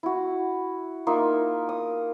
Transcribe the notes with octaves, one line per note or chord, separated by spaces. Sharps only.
E4 F#4
A#3 D#4 F4 E5
D#6